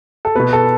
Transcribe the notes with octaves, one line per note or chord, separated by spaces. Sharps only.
A4
B2 B3 B4
A4